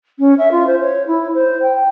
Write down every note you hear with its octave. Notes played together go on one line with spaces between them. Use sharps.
C#4
E5
F4
C5
C#5
E4
C5
G5